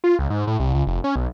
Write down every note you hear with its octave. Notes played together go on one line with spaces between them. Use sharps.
F4
C#2
G#2
A2
C2
C#2
F1
C#4
B1